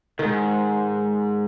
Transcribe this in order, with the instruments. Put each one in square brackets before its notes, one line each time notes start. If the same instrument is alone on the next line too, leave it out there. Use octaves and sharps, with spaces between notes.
[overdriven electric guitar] G#2 [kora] D#3